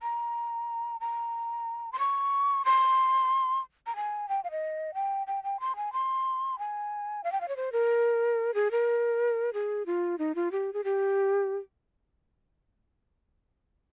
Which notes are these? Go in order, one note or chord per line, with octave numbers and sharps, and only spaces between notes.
A#5
A#5
C6
C#6
C6
A#5
G#5
G5
F5
D#5
G5
G5
G5
C6
G#5
C6
G#5
F5
G5
F5
C#5
C5
A#4
G#4
A#4
G#4
F4
D#4
F4
G4
G#4
G4